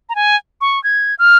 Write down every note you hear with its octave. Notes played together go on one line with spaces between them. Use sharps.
A#5
G#5
C#6
G#6
F6